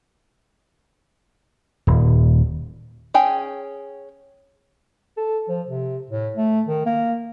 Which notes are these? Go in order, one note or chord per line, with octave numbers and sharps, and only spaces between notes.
D#1
C#4 G#4 G5 G#5
A4
F3
C3
A2
A3
D#3
A#3